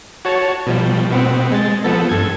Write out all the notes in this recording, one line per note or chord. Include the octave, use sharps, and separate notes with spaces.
F#4 C#5 A5
B2 F3 G3
B2 B3 C4
G#3 A6
F3 B3 A4
G2 A4 G#6